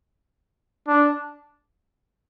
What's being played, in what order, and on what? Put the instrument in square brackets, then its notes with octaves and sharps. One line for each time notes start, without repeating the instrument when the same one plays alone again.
[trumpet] D4